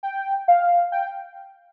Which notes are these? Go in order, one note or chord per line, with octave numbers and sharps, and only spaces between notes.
G5
F5
G5